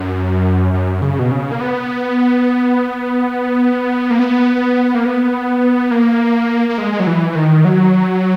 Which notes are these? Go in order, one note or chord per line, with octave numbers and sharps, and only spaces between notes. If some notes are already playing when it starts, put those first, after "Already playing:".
Already playing: F#2
F#2
C#3
B2
C#3
A#3
B3
A#3
B3
A#3
B3
A#3
A#3
G#3
G#3
F#3
E3
E3
D#3
F#3